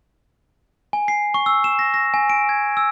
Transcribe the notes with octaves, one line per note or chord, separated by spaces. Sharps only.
G#5
C7
C#6
E6
E7
A#6
A#6
G#5
D7
G#6
E6